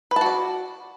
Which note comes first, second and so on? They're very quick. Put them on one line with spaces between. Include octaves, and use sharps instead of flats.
B4 A5 F#4 D5